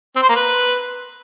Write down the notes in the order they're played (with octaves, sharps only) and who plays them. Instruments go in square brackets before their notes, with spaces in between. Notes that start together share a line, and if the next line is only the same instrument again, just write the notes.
[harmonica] C4
C5
A#3
B4